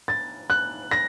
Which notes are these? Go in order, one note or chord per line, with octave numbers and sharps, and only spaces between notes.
A6
F#6
A#6